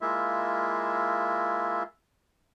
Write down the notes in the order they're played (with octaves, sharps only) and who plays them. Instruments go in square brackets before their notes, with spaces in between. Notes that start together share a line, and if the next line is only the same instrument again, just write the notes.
[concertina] G#3 A#3 E4 F4 E5